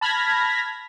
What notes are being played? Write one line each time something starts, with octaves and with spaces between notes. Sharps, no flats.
A5 B5 F6 G#6 A#6 B6